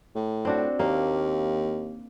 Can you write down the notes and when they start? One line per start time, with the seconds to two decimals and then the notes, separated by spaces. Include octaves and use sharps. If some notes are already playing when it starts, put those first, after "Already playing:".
0.15 A2
0.45 C4 D4 F#4
0.79 D#2 A#3